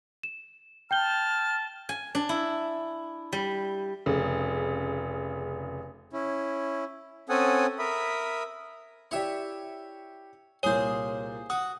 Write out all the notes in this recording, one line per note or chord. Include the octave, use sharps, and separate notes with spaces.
E7
G5 A5 F6 G6 G7
G#5
D4
E4
G3
F1 C#3
C#4 E4
C4 C#4 A4 F#5 G#5 D#6
A#4 E5 B5 D#6
E4 G4 C#5 D5 E5
C2 A#2 G#4 C5 C#5
F#4 D#6